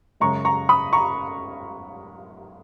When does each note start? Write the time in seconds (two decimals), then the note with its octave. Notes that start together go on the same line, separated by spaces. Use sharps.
0.20 F#2 C#3 G#3 A#5 C#6
0.45 A#5 C#6
0.69 B5 D#6
0.93 A#5 C#6